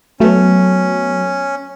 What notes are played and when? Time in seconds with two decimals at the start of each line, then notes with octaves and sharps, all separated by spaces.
0.20 F#3 A3 B3 C#4